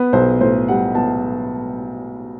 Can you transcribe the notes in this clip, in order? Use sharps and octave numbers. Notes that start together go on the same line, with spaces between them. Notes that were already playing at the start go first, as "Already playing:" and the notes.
Already playing: B3 B4
B1 C5
A2 C5
G3 F#5
B3 A5